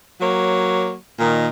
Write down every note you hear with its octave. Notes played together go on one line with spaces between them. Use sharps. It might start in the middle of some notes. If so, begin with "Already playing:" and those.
F#3 A#3 C#5
A#2 D#3